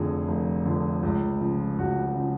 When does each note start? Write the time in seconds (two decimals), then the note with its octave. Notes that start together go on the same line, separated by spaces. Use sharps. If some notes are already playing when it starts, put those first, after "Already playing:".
Already playing: F1 F2 D3 G#4
0.28 F1
0.66 F2 D3
1.03 C#2
1.41 C#3 F3
1.79 C#2 F#4
2.03 F#4
2.15 C#3 F3